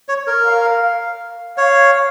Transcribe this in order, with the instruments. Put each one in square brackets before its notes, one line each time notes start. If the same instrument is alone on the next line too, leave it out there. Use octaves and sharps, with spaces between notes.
[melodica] C#5
A#4
[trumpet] F5
[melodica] C#5 [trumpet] F5